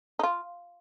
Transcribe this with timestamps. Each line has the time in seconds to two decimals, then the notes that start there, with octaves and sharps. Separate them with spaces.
0.19 D#4
0.23 F4